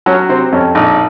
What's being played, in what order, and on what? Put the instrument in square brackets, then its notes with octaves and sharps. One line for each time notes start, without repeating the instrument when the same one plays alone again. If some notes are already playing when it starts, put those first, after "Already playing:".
[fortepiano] F#3 C#4
C3 C4
F2 C#4
A#1 D#4